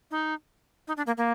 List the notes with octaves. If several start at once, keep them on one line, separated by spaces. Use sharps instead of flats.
D#4
D#4
D4
A#3
A#3